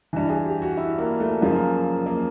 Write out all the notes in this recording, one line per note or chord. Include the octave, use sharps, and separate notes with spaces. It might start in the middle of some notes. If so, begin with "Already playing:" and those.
G2 E3
G#4
G4
F#4
E4
A#3
A3
F#2 C#3 F3 A#3
A#3